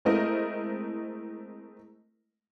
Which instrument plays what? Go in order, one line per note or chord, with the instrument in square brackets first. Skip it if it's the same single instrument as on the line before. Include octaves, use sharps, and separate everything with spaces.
[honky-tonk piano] G#3 A3 C4 E4 A#4 D#5